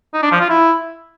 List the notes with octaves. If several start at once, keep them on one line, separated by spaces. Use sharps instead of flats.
D#4
D4
F3
F4
E4